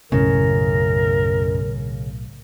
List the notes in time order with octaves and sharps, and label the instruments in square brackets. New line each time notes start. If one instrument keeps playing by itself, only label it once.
[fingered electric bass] B1 A2 [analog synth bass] F#2 [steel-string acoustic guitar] C#3 [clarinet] A#4